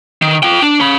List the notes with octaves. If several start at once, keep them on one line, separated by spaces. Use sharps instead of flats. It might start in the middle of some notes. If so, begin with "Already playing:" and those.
D#3
F4 G5
D4
C#4 B5